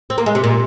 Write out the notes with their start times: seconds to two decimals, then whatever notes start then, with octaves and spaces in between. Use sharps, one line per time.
0.10 C4
0.18 A#3
0.26 G#3
0.35 C3
0.44 A#2